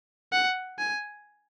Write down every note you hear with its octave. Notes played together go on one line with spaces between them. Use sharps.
F#5
G#5